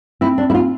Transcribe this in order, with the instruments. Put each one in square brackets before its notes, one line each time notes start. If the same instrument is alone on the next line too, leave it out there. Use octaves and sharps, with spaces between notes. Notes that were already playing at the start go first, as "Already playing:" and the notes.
[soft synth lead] C4 [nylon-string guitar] E4
[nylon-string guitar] D4
E4
F4